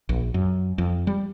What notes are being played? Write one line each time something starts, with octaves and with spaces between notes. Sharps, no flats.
A#1
F#2
F2
G3